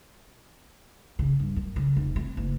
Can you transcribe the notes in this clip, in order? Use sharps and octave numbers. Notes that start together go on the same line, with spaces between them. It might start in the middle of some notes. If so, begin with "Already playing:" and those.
C#3
G2
F#2
C#3
F1
C4
F#1